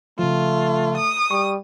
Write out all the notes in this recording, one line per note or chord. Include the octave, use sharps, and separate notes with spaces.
C#3 F3 A3 F4
D#6
G3 C#6